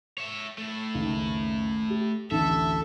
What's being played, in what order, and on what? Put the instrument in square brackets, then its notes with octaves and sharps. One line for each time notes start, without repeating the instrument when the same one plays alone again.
[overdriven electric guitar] C#5 E5
A3 E4
[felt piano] F#1 C#2 D#3
G4
[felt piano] A1 D2 [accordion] A4 [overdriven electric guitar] E5